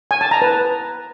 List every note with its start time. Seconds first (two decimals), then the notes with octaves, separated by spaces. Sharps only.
0.11 G#5
0.21 A5
0.31 A#5
0.42 B4